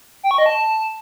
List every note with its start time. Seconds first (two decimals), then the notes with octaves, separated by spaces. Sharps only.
0.23 G5
0.31 C#6
0.38 D#5
0.46 A5